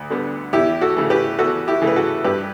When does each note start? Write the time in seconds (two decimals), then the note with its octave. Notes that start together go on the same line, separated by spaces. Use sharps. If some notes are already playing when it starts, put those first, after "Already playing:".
Already playing: D2
0.10 D3 G3 B3
0.53 E2 E4 G4
0.81 F#4 A4
0.96 C#3 E3 A3
1.10 G4 B4
1.39 E2 F#4 A4
1.67 E4 G4
1.82 C#3 E3 A3
1.87 B4
1.96 F#4 A4
2.24 G2 G4 B4